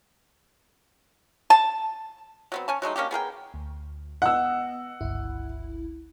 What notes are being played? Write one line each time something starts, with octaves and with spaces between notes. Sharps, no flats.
A5
F#3 B3 C4
C#4 G#5 A5
F#3 G#3 A3 D#4
A#3 C#4 D4 G4
B3 G#4 A#4 G5
D2
B3 D#5 F#5 E6
G1 C#2 E4